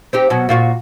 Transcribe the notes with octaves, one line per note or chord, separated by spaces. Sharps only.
C4 D#4 G4
B2 F#3
A#2 F4 F#4